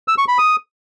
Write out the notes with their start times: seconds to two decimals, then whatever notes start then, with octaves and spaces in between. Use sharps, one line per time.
0.08 E6
0.18 C#6
0.28 B5
0.38 D#6